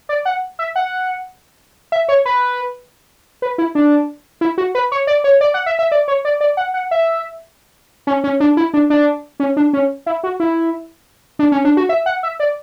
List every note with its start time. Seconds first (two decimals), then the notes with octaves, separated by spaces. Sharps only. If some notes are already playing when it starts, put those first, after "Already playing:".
0.09 D5
0.25 F#5
0.59 E5
0.76 F#5
1.92 E5
2.09 C#5
2.26 B4
3.42 B4
3.58 E4
3.75 D4
4.41 E4
4.58 F#4
4.75 B4
4.92 C#5
5.07 D5
5.24 C#5
5.41 D5
5.54 F#5
5.66 E5
5.79 E5
5.92 D5
6.08 C#5
6.25 D5
6.41 D5
6.57 F#5
6.74 F#5
6.91 E5
8.07 C#4
8.24 C#4
8.40 D4
8.57 E4
8.74 D4
8.90 D4
9.40 C#4
9.57 D4
9.73 C#4
10.06 E4
10.23 F#4
10.40 E4
11.39 D4
11.52 C#4
11.65 D4
11.77 F#4
11.89 E5
12.06 F#5
12.23 E5
12.40 D5